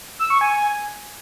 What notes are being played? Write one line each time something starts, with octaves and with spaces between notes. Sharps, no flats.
E6
C#6
G#5